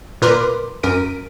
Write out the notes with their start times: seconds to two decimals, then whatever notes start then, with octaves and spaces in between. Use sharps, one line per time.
0.22 A#2 A#4 B4 C6 D6
0.83 F#2 A#4 B6 D7 D#7